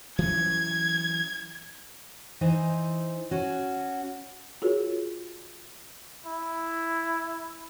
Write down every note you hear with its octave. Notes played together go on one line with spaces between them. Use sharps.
E3 F#3 C#4 G#6
E3 D#4 C5
C#4 F#4
F4 F#4 G#4 A#4 C#5
E4